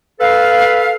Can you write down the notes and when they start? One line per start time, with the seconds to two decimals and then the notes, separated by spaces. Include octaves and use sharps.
0.20 A4 B4 F5